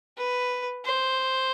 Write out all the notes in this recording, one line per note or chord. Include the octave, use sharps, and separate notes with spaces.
B4
C5